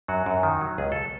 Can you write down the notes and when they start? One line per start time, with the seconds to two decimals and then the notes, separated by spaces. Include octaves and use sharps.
0.08 F#2 F#3 F#4
0.26 F#2
0.43 D#3
0.61 F#3
0.78 C#2 G#4
0.92 A4